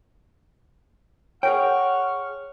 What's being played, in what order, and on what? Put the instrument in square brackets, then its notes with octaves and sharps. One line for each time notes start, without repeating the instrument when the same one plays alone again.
[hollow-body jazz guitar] G#4 A#4 G5 [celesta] C#5 [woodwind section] F#5 C#6 F6